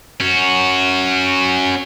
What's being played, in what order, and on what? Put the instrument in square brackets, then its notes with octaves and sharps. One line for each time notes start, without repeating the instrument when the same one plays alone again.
[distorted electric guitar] C#4 F#4